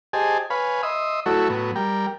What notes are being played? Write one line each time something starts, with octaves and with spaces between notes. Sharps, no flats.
G4 G#4 C5 D#5 G#5 A5
B4 C#5 F5 G#5 B5
D#5 E5 C6 D#6
F#3 A3 E4 F#4 A4 C#5
A2 F#3 B3
G3 A#4 G5